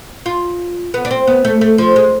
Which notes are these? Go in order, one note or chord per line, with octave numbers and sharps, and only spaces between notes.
F4
B3
D4
C4
B3
A3
A3
F3
G#3